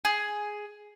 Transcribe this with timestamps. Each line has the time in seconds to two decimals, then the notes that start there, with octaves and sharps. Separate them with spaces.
0.05 G#4